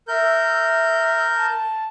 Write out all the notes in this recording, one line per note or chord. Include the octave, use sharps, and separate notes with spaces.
A#4 E5 G6
A5